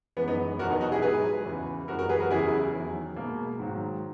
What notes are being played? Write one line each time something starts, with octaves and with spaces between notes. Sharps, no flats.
F#2 E3 G#3 B3
B3 D#4
E2 B2 F#3 F#4 A#4
B3 D#4
D#4 F#4
E4 G#4
G#2 F#3 G#4 B4
E2 C#3 E3
F#2 E3 G#3 F#4 A#4
F#4 A#4
G#4 B4
F#4 A#4
E2 C#3 F#3 E4 G#4
E2 D#3 F#3
B2 G#3 A#3
G#2 D#3 F#3